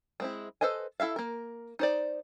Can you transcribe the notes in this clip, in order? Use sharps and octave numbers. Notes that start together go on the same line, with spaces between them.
G#3 C4 E4
A4 B4 C5 D#5 G#5
E4 A4 E5 F5
A#3 A#4
D#4 C5 D5